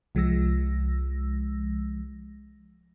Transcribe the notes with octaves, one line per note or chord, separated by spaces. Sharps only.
C2 F3 G#3 E6 A#6